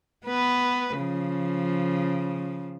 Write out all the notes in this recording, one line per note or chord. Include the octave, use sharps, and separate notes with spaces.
B3 B4
C#3 F3